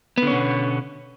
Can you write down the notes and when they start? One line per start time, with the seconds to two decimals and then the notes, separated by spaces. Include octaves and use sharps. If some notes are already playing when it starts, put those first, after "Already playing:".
0.18 B3
0.22 D3
0.27 C#4
0.32 B2